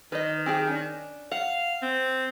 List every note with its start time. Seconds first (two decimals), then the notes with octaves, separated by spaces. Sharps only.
0.12 D#3 B4 D#5
0.46 C4 G4 G#4
0.67 C#4 D4
1.32 F5 F#5
1.82 C4